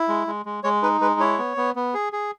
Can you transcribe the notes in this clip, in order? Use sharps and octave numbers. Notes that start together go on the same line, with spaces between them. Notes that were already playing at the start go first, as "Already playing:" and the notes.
Already playing: E4
G#3
G#3
G#3
G#3 C#5
D#4 B4
G#3 B4
E4 C#5
B3
B3
B3
G#4
G#4